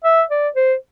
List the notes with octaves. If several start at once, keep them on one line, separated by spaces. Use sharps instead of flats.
E5
D5
C5